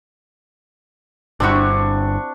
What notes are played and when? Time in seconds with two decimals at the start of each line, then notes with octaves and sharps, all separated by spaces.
1.40 G1 G2 C4 D4 E4 F#4 C#6